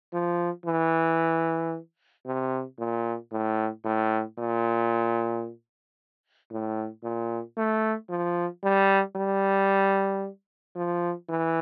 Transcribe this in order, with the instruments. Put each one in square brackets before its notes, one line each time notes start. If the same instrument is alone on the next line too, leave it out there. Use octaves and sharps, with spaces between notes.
[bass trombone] F3
E3
C3
A#2
A2
A2
A#2
A2
A#2
A3
F3
G3
G3
F3
E3